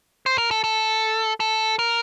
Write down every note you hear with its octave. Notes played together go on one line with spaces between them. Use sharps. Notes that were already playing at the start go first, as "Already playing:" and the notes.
C5
A#4
A4
A4
A4
A#4